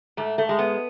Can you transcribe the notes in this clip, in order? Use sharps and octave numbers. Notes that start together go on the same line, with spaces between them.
G#2 A3
A3
G#3
B3